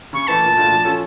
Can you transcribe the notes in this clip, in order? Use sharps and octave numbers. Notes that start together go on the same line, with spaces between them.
C#3 C#6
E3 A3 A5
A#2
A3 D4 F4
F3
C#4 F4 A4